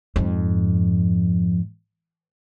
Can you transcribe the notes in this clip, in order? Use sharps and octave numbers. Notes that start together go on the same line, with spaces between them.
F2 G#2